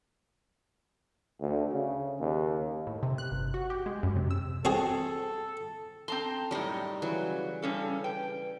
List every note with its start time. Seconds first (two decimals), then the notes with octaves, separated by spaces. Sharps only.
1.41 D2
1.73 C#3
2.19 D#2
2.87 A2
3.03 C3
3.18 F#6
3.31 G1
3.54 F#4
3.70 G4
3.86 G#3
4.03 F#2
4.16 C3
4.31 E6
4.65 C4 F#4 G#4 A4
6.08 C4 A4 A5 A#5 C6
6.51 F#2 A2 G3 D#4
7.02 C#3 E3 F#3
7.62 C#3 G3 C#4 A4
8.04 B4 G5